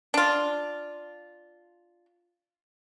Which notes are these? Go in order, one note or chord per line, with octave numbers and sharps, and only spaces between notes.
D4 F4